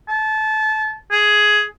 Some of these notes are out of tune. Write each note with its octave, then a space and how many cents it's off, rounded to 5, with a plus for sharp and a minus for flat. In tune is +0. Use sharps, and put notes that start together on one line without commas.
A5 -25
G#4 +10